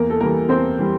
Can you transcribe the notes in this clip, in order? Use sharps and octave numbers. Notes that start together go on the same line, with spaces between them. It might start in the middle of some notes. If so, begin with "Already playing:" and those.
Already playing: E2 A#3 A#4
A4
E3 G3 A#3 A#4
E2 C4 C5
E3 G3